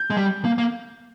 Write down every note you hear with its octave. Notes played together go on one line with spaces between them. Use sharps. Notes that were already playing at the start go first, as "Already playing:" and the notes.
Already playing: G6
G#3
G3
A#3
A#3